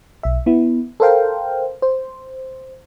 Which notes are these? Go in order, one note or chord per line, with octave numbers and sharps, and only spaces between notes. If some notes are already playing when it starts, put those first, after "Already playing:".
B1 E5
B3 E4
A4 A#4 C5 F5 G5
C5